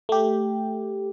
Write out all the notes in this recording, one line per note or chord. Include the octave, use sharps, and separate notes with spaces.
A3 G4